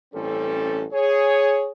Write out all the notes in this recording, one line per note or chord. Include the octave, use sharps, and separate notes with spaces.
A1 G2 G3 C4 C#4 A4
G#4 C#5